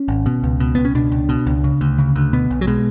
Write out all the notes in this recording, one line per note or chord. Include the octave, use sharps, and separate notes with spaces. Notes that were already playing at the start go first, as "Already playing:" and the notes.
Already playing: C#4
G#1
B2
C#2
B2
C#2 B3
C#4
B2 D4
C#2
B2
C#2
C#3
D2
C#3
D2
B2 B3
B1
F#3
B2 G#3